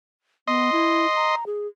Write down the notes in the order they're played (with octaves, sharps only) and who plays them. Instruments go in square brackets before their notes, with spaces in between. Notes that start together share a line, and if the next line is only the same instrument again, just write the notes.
[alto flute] B3 [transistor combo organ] D#5 C6
[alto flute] E4
A#5
G#4